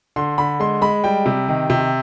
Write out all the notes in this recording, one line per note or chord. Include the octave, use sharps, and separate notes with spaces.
D3 C6
D3 B5
G#3 C6
G#3 B5
G3 G5
C3
D#3
C3